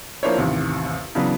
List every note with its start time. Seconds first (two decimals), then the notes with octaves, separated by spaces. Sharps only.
0.23 F3 A#3 D4 E4 C5 C#5
0.37 A1 D#2 C3
1.15 C#3 E3 F#3 B3 D4